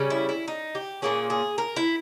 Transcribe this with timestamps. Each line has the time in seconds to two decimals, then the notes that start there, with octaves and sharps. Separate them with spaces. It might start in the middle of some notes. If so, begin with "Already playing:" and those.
Already playing: C#3 G3 C#4
0.10 E4
0.29 E4
0.48 D#4
0.75 G4
1.02 A#2 A#3 C#4 G#4
1.30 G#4
1.58 A#4
1.76 E4